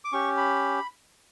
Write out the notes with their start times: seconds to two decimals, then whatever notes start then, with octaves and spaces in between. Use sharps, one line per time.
0.05 D6
0.13 C#4 G4 C#6
0.37 B5